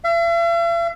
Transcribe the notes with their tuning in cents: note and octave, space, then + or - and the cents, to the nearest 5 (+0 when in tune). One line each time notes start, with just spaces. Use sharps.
E5 +45